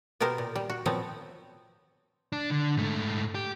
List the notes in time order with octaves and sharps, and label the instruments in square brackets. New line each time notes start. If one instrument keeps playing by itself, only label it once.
[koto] B2 B3 G4 A#4 C5
A#2
G3
F#4
A#2 F3 F#3 B3 C4
[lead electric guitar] D4
D3
G#2 A3
G4